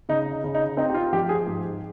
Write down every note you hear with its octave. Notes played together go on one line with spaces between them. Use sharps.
C#3 D#4
D#4
C#3
D#4
C4 D#4
G4
F4
F3 G4
G#4
G#2